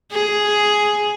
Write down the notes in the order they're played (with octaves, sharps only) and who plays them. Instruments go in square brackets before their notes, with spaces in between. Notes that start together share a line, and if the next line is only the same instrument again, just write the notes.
[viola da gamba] G#4